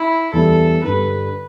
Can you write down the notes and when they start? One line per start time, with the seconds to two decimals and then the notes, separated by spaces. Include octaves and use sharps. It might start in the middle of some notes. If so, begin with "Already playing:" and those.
Already playing: E4
0.33 E2 E3 G3 A4
0.83 G2 D3 G3 B4